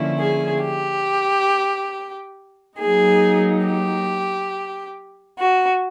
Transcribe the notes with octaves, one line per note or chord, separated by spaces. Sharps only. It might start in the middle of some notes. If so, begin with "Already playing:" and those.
Already playing: D3 F3 A#3 C#4 E4
G#4
G4
F#3 A#3 D#4 G#4
G4
F#4